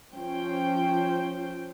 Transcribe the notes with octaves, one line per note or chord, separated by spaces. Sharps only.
F3 C#4 C5 G5